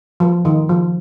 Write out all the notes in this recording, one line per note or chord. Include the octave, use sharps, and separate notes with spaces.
F3
D#3
F3